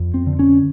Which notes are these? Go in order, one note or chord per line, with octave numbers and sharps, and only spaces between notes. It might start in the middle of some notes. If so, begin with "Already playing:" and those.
Already playing: F2
C4
D3
C#4